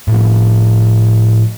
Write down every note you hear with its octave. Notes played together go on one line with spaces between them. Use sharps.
A2 F3